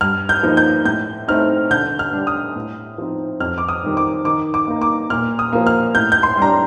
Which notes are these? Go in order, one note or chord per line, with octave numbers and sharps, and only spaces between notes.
G2 F6
G6
F3 A#3 D#4
G6
A2 G6
A3 C4 D#4 F6
D3 G6
F6
G3 D4
D#6
A2
F3 C4 D#4
F2 F6
D6
D#6
D#3 G3 C4 D#4
D6
D#3 D6
D6
A#3 D#4
D6
A#2 F6
D#6
F3 A#3
F6
A2 G6
G6
C6
G3 D4 A#5